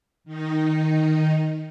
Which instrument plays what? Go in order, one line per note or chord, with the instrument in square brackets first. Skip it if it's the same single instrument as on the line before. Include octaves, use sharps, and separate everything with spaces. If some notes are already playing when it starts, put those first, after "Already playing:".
[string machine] D#3 D#4